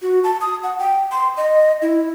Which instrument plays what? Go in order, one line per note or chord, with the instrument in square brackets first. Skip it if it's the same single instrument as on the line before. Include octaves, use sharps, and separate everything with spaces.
[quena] F#4
A5
D#6
F#5
G5
C6
D#5
E4